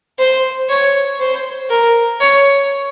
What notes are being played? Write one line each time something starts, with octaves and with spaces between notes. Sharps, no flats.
C5
C#5
C5
A#4
C#5